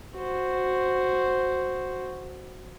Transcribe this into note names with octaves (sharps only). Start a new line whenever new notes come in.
F#4 C5